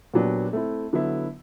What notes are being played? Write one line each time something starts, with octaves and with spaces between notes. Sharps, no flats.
A#2 F#3 B3 D4 G4
A3 C4 E4
D3 F#3 B3 E4